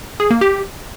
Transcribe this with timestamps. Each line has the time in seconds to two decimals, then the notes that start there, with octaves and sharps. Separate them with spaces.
0.20 G#4
0.31 A#3
0.41 G4